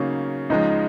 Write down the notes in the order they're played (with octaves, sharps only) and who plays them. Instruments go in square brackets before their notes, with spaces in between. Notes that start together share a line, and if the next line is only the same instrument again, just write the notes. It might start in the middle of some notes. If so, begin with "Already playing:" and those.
Already playing: [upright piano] C#3 F#3 A#3 D#4 [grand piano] C#4
[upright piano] C#2 C#3 F3 G#3 [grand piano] D#4